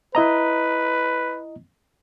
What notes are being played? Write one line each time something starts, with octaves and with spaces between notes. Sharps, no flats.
E4 B4 D#5 A#5